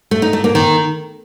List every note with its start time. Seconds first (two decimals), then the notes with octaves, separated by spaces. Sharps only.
0.11 A3
0.22 D#4
0.33 A3
0.44 A#3
0.55 D#3